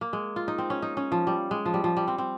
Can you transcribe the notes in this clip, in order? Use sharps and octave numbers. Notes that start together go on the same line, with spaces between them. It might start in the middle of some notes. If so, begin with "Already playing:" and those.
A#3
G#3
F4
D#4
C4
C#4
D#4
C#4
F3
G3
G#3
F3
G3
F3
G3
C4
C4